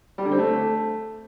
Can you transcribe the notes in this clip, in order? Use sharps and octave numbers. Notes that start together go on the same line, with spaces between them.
G3
D3
C4
A3